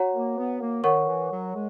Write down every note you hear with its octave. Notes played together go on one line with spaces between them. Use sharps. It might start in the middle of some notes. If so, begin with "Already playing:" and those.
Already playing: F#4 C#5 F#5 A#5
A#3
B3
A#3
D#3 A#4 C#5 F#5 C#6
E3
F#3
G#3